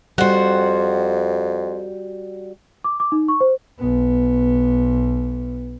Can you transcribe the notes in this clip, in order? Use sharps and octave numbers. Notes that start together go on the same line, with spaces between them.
F2 G3 F#4 C5 F#5
D6
D6
D#4
C#6
C5
B1 B3